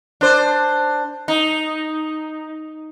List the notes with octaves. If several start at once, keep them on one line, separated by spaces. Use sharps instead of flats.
D4 C5
D#4